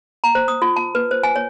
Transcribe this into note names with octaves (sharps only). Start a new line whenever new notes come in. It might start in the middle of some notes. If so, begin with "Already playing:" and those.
A#5
C5
D#6
F4
A5
B4
C5
G#5
C#5